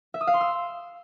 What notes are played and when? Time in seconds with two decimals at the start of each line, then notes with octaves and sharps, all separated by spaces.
0.14 E5
0.21 D#6
0.27 F5
0.34 C6
0.41 E6